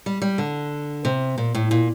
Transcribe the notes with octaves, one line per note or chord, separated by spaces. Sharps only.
G3
G3
D3
C3
A#2
A2
A#2